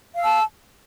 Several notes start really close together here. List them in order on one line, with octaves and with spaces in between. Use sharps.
F5 E6 A5